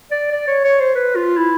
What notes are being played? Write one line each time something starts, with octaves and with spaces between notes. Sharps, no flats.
D5
D5
C#5
C#5
C5
B4
F4
E4